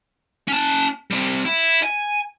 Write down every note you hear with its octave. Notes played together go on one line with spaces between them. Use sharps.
C#4 A5
G3 C4
E4
G#5